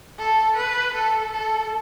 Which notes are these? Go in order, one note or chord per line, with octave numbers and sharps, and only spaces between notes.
A4
B4
A4
A4